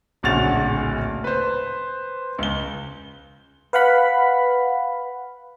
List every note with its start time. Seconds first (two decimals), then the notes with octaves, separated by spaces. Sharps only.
0.23 D1 A#1 C#3 F#4 A6 F7
1.24 B4 C5
2.39 C#2 G7
3.73 B4 F5 F#5 B5